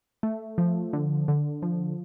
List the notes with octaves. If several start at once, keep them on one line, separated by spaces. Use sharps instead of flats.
A3
F3
D3
D3
F3